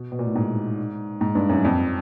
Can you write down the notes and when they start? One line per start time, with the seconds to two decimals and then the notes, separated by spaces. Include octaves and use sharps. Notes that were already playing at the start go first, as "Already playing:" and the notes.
Already playing: B2
0.12 B2
0.19 A#2
0.27 A2
0.36 G#2
1.21 G#2
1.35 G2
1.49 F#2
1.65 F2